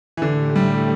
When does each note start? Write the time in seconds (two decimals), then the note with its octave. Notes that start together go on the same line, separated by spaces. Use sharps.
0.17 E3
0.22 A2 D3 A3 G4
0.56 G3